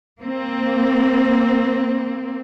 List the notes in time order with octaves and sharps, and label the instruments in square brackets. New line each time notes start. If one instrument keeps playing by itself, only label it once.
[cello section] A#3 C4